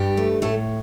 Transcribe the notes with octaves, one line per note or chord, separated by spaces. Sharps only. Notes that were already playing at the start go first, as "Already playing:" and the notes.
Already playing: G2 G3 G4
A3
A2 A3 A4